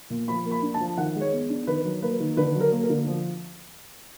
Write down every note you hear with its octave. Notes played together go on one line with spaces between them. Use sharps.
A#2
F3 B5
A#3
B5
D4
A5
F3
D#3 F#5
G#3
C#5
B3
D4
D#3 B4
F#3
A#3 B4
D#3
D3 B4
F#3
A#4
A#3
A#4
D3
F3